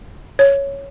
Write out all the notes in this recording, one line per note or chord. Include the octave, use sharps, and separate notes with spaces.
C#5